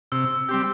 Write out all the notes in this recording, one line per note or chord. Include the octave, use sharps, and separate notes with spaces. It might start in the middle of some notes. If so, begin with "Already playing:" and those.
C3 E6
G3 C4 G4